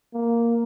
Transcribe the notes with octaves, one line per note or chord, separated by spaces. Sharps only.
A#3